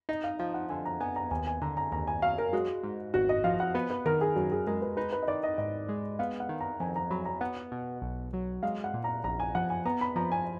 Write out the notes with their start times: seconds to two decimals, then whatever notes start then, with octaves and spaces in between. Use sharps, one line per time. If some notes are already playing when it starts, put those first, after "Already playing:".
0.09 D#4 D#5
0.24 F5
0.39 F3 F5
0.54 F#5
0.69 D3 G#5
0.85 A#5
1.00 B3 G#5
1.16 A#5
1.31 D#2 G#5
1.47 G#5
1.62 D3 A#5
1.77 A#5
1.92 D#2 A#5
2.07 G#5
2.22 F#3 F5
2.38 A#4
2.53 G#3 F#4
2.83 G#2
3.14 G#1 F#4
3.29 D#5
3.44 F3 F5
3.60 F#5
3.75 B3 B4
3.91 B4
4.06 D#3 A#4
4.21 G#4
4.36 F#2 F#4
4.52 G#4
4.67 G#3 A#4
4.82 B4
4.97 D#4 B4
5.13 B4
5.23 D#5
5.28 D#3 D5
5.43 D#5
5.58 G#2 D#5
5.89 G#3
6.19 B3 F5
6.40 F#5
6.49 D#3
6.60 A#5
6.80 F2 G#5
6.96 A#5
7.10 F#3 B5
7.25 A#5
7.41 B3 F#5
7.72 B2
8.02 B1
8.33 F#3
8.63 G#3 F5
8.84 F#5
8.94 A#2
9.04 A#5
9.24 A#1 A#5
9.40 G#5
9.55 F3 F#5
9.70 G#5
9.85 B3 A#5
10.01 B5
10.16 F3 A#5
10.32 G#5